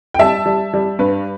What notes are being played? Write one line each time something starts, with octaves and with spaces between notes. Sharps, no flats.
G5
G3 E5 A5
G3
G3
G2 B4